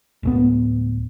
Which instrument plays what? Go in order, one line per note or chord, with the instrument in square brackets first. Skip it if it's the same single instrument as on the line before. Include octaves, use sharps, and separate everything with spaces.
[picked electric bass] D1 D2 B3